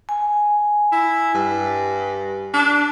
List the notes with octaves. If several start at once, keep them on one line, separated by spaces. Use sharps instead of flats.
G#5
E4
G2
D4